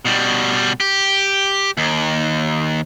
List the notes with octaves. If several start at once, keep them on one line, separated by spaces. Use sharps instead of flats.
B2 G3
G4
D#2